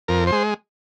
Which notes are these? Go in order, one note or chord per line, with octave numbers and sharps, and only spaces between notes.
F2 A#4
C5
G#3